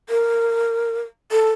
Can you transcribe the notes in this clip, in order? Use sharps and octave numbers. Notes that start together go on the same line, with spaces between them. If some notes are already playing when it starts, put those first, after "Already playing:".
A#4
A4